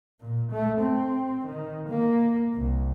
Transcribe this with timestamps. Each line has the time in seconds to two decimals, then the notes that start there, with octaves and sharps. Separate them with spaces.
0.21 A#2
0.52 A3
0.81 C4
1.46 D#3
1.89 A#3
2.54 C2